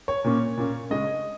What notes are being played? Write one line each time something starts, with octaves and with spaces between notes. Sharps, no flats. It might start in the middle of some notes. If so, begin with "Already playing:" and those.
C#5
A#2 A#3 C#4
A#2 A#3 C#4
C#3 G#3 C#4 D#5